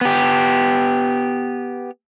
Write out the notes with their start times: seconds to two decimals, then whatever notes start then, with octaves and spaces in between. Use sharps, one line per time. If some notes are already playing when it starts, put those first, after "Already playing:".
0.01 B3 G4